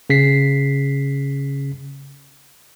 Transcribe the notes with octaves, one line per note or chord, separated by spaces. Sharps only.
C#3 B6 C7